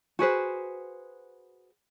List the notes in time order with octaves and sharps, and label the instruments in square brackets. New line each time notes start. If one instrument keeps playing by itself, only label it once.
[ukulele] F#4 G#4 B4 C5